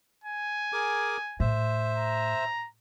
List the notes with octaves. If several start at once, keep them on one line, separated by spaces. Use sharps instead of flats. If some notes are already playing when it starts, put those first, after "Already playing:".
G#5
G#4 A#4 D6
A2 C5 E5
A#5